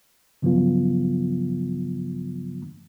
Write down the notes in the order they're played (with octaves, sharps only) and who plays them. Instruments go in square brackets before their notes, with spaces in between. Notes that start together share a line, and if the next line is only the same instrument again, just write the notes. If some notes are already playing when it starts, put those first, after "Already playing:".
[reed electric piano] G2 C#3 F3 F#3 B3 F4